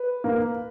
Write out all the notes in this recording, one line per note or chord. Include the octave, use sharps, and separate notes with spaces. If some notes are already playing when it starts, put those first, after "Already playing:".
Already playing: B4
A#3